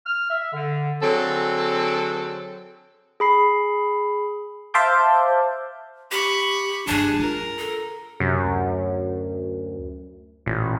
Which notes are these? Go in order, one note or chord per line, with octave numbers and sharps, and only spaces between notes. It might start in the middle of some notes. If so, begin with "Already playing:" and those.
F6
E5
D3
D3 F#3 C4 G#4 A4
G#4 B5 C7
C5 E5 F5 A5 D6 G6
G4 B5 C#6
F#1 G2 D4 G#4 A5
F4 A#4
A4
F#2 C3
D2
A1 A#2